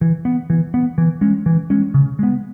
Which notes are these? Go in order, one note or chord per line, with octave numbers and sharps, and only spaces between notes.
E3
B3
E3
B3
E3
G#3 C#4
E3
G#3 C#4
C#3
G#3 B3